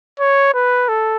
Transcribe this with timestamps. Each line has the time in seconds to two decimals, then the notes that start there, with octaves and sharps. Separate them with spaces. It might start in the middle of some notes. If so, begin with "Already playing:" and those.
0.20 C#5
0.54 B4
0.89 A4